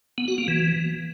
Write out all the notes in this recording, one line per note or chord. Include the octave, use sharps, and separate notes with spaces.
B3
F#4
A#3
E3